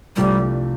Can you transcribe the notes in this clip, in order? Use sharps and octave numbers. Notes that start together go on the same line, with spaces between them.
C2 C3 F3 G3 A3 D4